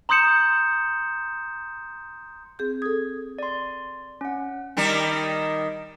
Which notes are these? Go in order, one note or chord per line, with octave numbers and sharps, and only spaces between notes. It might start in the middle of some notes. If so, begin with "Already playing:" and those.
A#5 C6 D#6 G6 C#7 E7
C4 G#4 G6
A4 D#6 G#6
D5 C6
C#4 F#5
D#3 G3 A#4